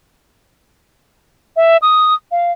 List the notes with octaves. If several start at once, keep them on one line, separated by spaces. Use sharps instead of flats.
E5
D#6
F5